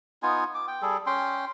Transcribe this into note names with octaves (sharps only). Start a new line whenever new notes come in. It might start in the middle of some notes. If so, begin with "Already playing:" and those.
B3 D#4 F4 G#5
D6
G5
G3 G#4 A4
C#4 G5 C6